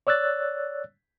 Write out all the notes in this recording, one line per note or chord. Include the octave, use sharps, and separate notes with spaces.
C#5 D5 E6 F#6 A6